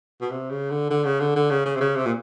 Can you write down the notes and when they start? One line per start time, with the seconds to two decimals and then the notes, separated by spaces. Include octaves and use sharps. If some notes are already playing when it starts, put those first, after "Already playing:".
0.21 B2
0.31 C3
0.50 C#3
0.71 D3
0.90 D3
1.05 C#3
1.20 D3
1.36 D3
1.50 C#3
1.66 C#3
1.76 C3
1.80 C#3
1.96 C3
2.06 A#2